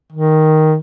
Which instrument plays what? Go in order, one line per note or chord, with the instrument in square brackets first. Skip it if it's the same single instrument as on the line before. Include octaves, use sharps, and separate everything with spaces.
[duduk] D#3